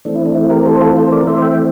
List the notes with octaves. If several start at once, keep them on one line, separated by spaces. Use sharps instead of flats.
E3 A3 C4 D4
E4
D4
E4
G4 A#4
A4 C5
F4 A4
A4 C5
A#4 D5
E3 A3 C4 C5 E5
E5 G5